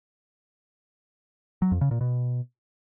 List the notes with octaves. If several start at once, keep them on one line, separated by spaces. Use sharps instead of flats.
F#3
F2
C#3
A#2
B2